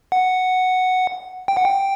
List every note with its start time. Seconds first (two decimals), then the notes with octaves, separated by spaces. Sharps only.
0.12 F#5
1.48 G5
1.57 F#5
1.65 G5